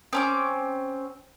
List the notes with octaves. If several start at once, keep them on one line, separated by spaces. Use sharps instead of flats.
C4 C#4 D6